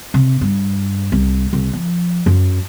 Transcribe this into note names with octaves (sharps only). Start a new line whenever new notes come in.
C3
G2
C2
C2
F3
F#2